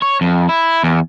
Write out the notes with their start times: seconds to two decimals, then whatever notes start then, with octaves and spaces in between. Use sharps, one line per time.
0.02 C#5
0.21 F2
0.49 E4
0.84 E2